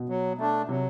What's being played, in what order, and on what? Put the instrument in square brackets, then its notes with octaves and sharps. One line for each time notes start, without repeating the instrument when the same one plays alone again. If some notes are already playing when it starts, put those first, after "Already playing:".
Already playing: [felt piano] B2
[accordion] F#3
A3 D4
[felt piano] C3 [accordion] F#3